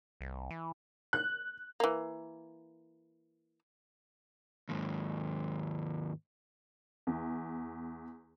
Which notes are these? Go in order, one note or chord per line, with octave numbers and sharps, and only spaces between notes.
C2
E3
F#6
E3 A#3
D#2 G#2
E2